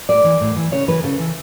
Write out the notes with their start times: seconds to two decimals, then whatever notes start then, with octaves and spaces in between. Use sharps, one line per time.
0.09 A2 D5
0.24 E3
0.41 A2
0.56 E3
0.72 C#3 C#5
0.88 E3 B4
1.04 C#3 A4
1.19 E3